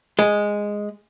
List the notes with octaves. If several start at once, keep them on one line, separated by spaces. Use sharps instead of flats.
G#3